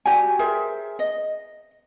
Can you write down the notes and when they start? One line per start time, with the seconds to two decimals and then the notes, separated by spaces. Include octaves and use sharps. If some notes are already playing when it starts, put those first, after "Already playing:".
0.05 F#4 G4 D5 G#5
0.39 G#4 A#4 C5 E5
0.99 D#5